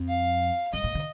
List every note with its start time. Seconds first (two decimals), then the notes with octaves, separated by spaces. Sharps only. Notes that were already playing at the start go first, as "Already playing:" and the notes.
Already playing: F2
0.08 F5
0.73 G2 D#5
0.84 A2
0.95 D3